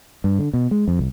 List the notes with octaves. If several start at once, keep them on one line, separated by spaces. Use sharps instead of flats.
G2
D3
B2
G#3
F2
C2